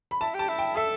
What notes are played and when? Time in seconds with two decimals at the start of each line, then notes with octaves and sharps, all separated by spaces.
0.11 B5
0.21 E4 A5
0.34 G4
0.39 A5
0.48 E4
0.59 G5
0.76 A4 E5